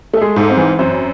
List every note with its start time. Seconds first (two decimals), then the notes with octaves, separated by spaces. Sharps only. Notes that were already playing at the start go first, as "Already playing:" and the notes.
0.13 A3 A4
0.21 G#3 G#4
0.36 G#2 A4
0.50 C4 C5
0.57 E3
0.79 F#2 C4 C5